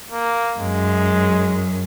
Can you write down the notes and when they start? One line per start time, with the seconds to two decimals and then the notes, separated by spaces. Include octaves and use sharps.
0.11 A#3
0.59 F#2 G#3